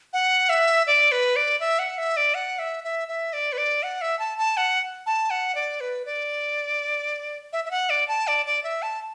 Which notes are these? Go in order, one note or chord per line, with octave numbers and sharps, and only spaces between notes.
F#5
E5
D5
B4
D5
E5
F#5
E5
D5
F#5
E5
E5
E5
D5
B4
D5
F#5
E5
A5
A5
F#5
A5
F#5
D5
B4
D5
E5
E5
F#5
D5
A5
D5
D5
E5
A5